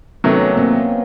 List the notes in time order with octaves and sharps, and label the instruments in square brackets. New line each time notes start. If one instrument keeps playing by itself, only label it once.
[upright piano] C3 D#3 F#3 A3 [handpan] B3 C#4
[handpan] A#3 C4